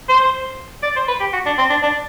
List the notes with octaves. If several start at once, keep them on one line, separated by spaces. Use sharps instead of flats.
C5
D5
C5
B4
G4
F#4
D4
C4
D4
D4